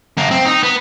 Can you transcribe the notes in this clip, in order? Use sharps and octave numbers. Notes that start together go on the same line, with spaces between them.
F#2 A#3
C4
D#4
B3